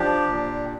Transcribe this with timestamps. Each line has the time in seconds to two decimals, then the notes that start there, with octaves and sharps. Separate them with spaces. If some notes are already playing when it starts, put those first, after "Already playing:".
Already playing: F3 D4 G4
0.28 A#2